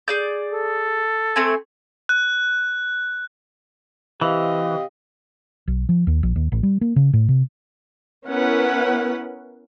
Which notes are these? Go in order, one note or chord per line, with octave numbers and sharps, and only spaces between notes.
G#4 D5 G6
A4
A3 C4 G#5
F#6
C3 E3 G4 D#5 F5
B1
F3
D#2
A#1
D#2
A1
G3
A#3
C#3
A2
C3
B3 C#4 E4 A#4 B4 F#5